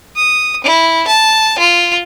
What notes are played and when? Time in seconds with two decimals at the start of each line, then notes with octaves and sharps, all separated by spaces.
0.16 D#6
0.64 E4
1.07 A5
1.58 F4